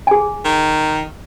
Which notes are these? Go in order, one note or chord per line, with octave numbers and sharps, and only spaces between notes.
G#4 G#5
D#3